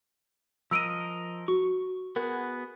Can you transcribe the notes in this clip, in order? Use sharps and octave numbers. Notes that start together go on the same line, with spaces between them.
F3 A#4 D#5 E6 D7 D#7
F#4 C#6
B3 F#4 G#4 A#4